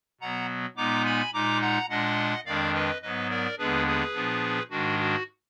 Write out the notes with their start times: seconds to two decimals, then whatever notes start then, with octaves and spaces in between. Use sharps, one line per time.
0.21 B2 F#3 B3 F#5 A#5
0.77 A#2 G#3 B3 D#4 A#5 D6
1.05 G#5 B5
1.33 A#2 G#3 D#4 A#5 D6
1.61 F#5 A#5
1.89 A#2 G#3 D4 D#5 F#5
2.46 F2 D#3 G#3 D4 D5 F5
2.74 B4 D#5
3.02 G#2 F#3 B3 B4 D#5
3.30 A#4 D5
3.58 D#2 D3 G#3 B3 D4 G#4 B4
3.86 G#4 B4
4.14 A#2 F3 B3 D4
4.70 G#2 D#3 G#3 D4 F#4
4.99 F#4